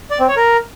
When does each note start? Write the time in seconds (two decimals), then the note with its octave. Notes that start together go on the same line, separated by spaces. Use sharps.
0.11 D5
0.20 C4
0.28 C#5
0.37 A#4